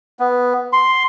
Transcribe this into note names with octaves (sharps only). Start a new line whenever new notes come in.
B3
C6